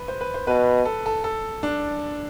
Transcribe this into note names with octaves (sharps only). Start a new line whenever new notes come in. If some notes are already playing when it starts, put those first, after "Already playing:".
Already playing: B4
C5
B4
C5
B2 B4
A4
A4
A4
D4